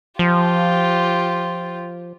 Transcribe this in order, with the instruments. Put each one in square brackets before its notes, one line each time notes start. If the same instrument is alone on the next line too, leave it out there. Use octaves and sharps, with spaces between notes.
[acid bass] F3 [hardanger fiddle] F4 G4